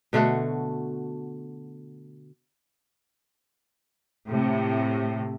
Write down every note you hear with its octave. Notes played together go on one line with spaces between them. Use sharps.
B2 D3 A3 F#4
A2 C3